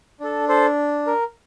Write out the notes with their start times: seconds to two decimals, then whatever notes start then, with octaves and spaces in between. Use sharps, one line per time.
0.20 D4 A4
0.49 A4 C5
1.06 A#4